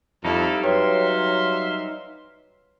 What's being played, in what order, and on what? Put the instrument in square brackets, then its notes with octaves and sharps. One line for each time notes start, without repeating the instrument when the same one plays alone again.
[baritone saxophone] F2 [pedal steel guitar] G3 D#4 [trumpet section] E4 A4 F5
[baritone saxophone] F#3 [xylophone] B4 C#5 G5 [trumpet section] E5 F5 C6